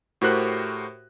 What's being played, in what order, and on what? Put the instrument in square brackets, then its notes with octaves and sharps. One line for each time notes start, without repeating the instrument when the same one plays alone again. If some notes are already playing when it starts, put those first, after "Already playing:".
[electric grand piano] A2 F#4 G4 A#4 C5 F#6